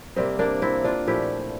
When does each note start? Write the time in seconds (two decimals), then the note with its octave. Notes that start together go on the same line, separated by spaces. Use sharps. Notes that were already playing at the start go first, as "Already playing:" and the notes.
0.16 C3 G3 A#3 C4
0.39 A#3 D4
0.62 C4 E4
0.84 D4 F4
1.07 A#2 F3 A3 E4 G4